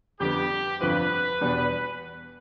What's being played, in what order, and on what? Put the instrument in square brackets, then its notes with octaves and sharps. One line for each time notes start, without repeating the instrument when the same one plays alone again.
[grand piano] F2 D3 G3 B3 [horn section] G4
[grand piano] G1 F2 D3 F3 C4 [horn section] B4
[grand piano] E2 B2 G3 B3 D4